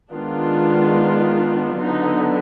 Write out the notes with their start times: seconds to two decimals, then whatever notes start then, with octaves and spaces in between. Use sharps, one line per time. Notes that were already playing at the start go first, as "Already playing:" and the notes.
0.12 D#3 G#3 B3 D4 F4
1.81 D3 F#3 B3 D#4